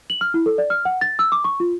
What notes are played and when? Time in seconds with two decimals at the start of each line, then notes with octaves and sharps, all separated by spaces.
0.10 F#7
0.21 F6
0.34 E4
0.46 A4
0.58 D5
0.70 F6
0.85 F#5
1.01 A6
1.19 E6
1.32 D6
1.44 C#6
1.60 F4